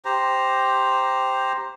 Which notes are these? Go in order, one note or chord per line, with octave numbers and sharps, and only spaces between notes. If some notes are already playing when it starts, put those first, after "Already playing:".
G4 C5 A#5